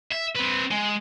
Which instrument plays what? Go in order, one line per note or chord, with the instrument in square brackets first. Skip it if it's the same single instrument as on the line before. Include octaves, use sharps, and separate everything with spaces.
[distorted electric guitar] E5
C4 B4
G#3